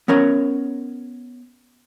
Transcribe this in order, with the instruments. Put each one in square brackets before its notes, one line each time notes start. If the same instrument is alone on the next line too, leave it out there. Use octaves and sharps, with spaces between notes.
[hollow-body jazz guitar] B3 C#4 A#4 C#5